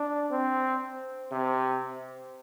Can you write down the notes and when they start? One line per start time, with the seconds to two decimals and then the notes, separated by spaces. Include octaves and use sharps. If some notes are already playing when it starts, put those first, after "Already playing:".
Already playing: D4
0.31 C4
1.32 C3